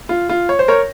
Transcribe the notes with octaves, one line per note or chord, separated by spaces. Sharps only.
F4
F4
C#5
C5
A#4 C#5